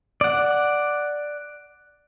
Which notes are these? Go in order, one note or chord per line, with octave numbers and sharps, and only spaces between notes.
D5 F#5